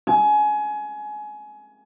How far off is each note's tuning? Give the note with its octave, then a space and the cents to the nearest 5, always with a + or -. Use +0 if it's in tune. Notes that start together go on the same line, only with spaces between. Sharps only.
G#5 +25